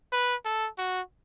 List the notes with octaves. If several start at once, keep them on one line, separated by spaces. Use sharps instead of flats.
B4
A4
F#4